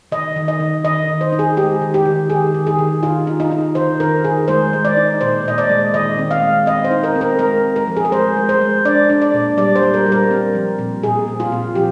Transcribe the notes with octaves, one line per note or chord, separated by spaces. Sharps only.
D#3 D#5
D#3
D#5
D#3
D#3 D#5
D#3
C5
D#4
G#4
G#3 G4
D#3
G4
D#3
D#3 G#4
D#3
G#4
D#3
D#4 F4
D#4
D#4
D#4
D#3 C5
D#4 A#4
D#3 G#4
G#3 C5
G#3
D5
D#4
A#2 C5
A#2 D#5
D5
G#3
D#3 D#5
C4
F5
G#3
C4 D#5
C5
D#4
A#4
C4
A#4
G#3 A#4
G#3
A#4
F3
G#4
A#4
G#3 C5
G#3
C5
G#3
D4 D5
D4
D5
A#2
G3 D5
C5
G3
A#4
G3
A#4
C4
F3
A#2
A#2 G#4
C4
F4
A#2
F3 G4